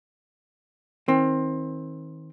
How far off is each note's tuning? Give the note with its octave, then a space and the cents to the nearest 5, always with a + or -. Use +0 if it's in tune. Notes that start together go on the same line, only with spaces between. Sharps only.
D#3 +35 C4 +20